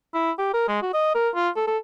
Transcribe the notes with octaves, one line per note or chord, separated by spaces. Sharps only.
E4
G4
A#4
G#3
F#4
D#5
A#4
F4
A4
A4